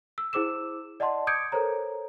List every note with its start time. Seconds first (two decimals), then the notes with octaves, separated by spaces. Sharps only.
0.18 E6
0.33 E4 G#4 C5 D6 E6 E7
1.00 D5 D#5 F#5 A5 C6
1.27 D6 D#6 G6 G#6 C#7 D7
1.52 A4 A#4 C5 C#5 A#5